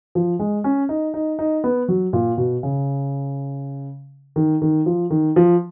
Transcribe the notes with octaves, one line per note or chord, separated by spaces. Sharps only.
F3
G#3
C#4
D#4
D#4
D#4
B3
F#3
A#2
B2
C#3
D#3
D#3
F3
D#3
F3